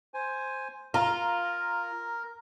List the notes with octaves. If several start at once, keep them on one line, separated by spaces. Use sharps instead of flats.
C5 G#5
F4 A#4 A#5